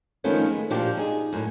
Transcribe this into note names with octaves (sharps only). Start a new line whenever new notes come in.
D#3 F3 A3 B3 C#4
G#3
A#2 F3 D4 F#4 G4
D#4 G#4
F#2 A2